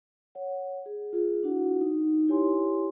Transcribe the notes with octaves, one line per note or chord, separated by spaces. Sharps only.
C#5 F#5
G#4
F4 G#4
D4 E4 F#4 F#5
D#4
E4 G4 C#5 G#5 C6